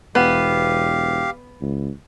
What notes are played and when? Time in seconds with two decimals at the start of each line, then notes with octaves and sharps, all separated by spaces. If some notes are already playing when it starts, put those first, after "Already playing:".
0.15 E1 B3 G4 F5
1.61 C#2